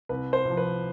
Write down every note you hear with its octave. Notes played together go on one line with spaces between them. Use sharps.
C2 B4
C5
C3 F3
B4